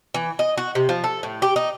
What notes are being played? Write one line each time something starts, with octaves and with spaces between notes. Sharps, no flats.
E3
D#5
F#4
C3
F3
A4
A2
G4
D#4